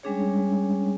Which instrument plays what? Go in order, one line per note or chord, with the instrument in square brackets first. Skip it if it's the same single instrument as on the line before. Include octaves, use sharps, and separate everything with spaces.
[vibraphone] G3 G#3 C#4 D4 G#4 C#5